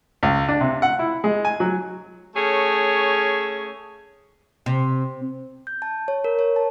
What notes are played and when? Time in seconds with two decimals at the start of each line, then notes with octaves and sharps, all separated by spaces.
0.23 C#2
0.48 D4
0.61 C3
0.82 F#5
0.99 E4
1.24 G#3
1.45 G#5
1.60 F#3
2.35 A3 C#4 G#4 C#5
4.66 C3
5.67 G6
5.82 A5
6.08 C#5
6.24 A#4
6.39 C#5
6.56 A5